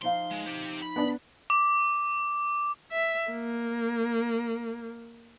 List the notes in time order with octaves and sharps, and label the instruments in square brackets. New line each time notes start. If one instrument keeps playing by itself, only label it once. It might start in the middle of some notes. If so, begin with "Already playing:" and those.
[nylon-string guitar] F3 D#4 F5 [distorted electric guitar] C6
[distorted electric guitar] G#3
G4 C5
B5
[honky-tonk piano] B3 D4
[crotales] D6
[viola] E5
A#3